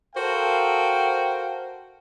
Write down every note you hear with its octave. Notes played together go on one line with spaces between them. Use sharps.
F#4 A4 A#4 C5 F5 G5